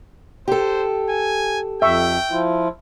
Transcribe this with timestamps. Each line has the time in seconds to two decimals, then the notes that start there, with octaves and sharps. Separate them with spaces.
0.48 G4 A4 C5
1.09 G#5
1.82 F2 E5 G5 C#6
2.31 F3 E4 F4